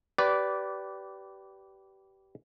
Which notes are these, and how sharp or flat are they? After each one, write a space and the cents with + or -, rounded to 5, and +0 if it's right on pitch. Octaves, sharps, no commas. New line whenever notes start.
G4 -25 B4 +0 D5 -15